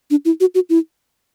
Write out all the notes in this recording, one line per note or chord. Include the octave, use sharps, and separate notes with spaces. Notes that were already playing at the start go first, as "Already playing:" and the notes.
D4
E4
F#4
F#4
E4